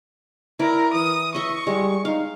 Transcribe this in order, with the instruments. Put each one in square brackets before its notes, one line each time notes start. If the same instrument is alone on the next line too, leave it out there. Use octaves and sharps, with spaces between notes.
[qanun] E4 D5 [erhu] A#4
[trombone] E3 [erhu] D#6
[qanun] D#5 E5 [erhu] C#6
[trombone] G3 [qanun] G#3
[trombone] D#4 [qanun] F5